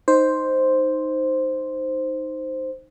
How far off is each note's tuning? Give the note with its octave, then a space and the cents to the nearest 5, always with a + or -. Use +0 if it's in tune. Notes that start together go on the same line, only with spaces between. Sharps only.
D#4 +0 C5 +0